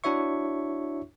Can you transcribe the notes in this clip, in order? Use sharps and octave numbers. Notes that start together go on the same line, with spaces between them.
D4 E4 F#4 C#5 E5 C#6